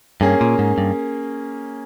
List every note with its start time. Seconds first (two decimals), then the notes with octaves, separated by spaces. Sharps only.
0.21 G2 A#3 C#4 G#4
0.41 A#2
0.59 G#2
0.78 G2